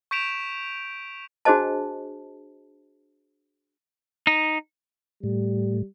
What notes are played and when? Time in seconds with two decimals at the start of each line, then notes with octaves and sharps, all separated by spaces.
0.11 C#6 G6 B6 D7 E7 F7
1.45 D4 F#4 G#4 C5 D#5 A5
4.27 D#4
5.23 A2 G3